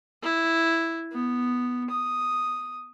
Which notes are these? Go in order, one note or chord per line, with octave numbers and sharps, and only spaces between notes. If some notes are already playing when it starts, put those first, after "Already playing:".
E4
B3
D#6